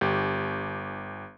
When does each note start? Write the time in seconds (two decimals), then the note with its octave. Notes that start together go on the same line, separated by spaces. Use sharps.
0.01 G1 G4